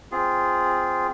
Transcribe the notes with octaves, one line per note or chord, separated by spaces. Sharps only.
C4 F4 G#4